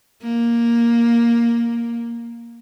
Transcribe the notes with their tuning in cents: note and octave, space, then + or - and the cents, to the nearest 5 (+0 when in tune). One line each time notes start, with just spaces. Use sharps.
A#3 +5